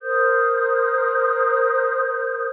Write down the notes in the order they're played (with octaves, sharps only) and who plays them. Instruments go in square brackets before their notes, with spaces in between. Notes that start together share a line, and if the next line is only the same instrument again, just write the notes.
[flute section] A#4 C5 D#6 G6